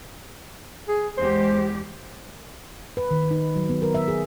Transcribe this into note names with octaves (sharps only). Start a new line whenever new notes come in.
G#4
E2 G#3 G4 C5
B4
D#3
D#4
F#3
B3
A#4
E5
G#4